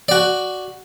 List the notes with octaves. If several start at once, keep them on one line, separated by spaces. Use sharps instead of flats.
F#4 D5